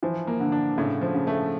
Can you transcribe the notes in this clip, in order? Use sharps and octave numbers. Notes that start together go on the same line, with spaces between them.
E3 F3
A#3
D3
D4
A2 C#3
F3
C#3
A3